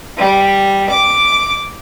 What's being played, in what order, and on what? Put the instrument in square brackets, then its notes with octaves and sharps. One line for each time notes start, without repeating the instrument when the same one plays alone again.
[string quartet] G3
D6